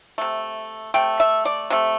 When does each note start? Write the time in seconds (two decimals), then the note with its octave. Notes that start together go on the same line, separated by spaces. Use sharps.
0.18 C3 A3
0.94 C3 A3 G5
1.20 E5
1.45 D5
1.70 C3 A3